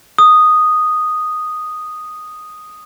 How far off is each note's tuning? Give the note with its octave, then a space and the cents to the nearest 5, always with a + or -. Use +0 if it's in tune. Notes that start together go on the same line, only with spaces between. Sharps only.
D#6 -5